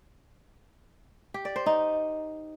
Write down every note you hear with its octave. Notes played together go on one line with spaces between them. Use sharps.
G4
D5
C5
D#4